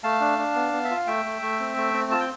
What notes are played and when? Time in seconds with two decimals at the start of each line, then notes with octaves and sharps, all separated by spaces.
0.04 A3 F5 A5
0.20 D4
0.39 D4
0.55 B3
0.73 B3
0.84 E5
0.91 F4
0.96 F5
1.07 A3 E5 G5
1.25 A3
1.42 A3
1.60 C4
1.77 A3
1.94 C4
2.11 F4 A5
2.20 G5